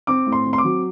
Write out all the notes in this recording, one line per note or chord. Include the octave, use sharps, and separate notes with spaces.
C4 D6
A2
C6
C4
C6
D6
F#3